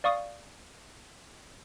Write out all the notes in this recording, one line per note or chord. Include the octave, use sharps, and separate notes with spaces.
D5 F5 C#6 D#6